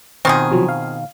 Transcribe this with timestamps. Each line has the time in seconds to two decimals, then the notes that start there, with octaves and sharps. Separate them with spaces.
0.25 B2 D#3 C4 F4 G#4
0.51 C3 F3 F#3
0.68 F5